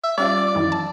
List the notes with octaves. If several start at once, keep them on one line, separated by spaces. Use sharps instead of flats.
E5
G3 C#4 F4 D5
F#2 D#3 E3
A5